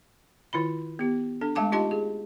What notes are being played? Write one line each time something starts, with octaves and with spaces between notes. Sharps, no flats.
D#3 E4 F4 B5
B3 G4
D4 A4
G#3 A3 F5 A5 D6
D#4 F4 G4 D#5 A5 C6
G#4